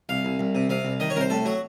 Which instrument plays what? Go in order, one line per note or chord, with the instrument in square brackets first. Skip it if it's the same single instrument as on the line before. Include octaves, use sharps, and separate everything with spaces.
[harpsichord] C2 F5
C2
C2
C3
C3 F5
C2
D#3 D#5
C#5
C2 A#4
C5
A2 A4
F#3 F#4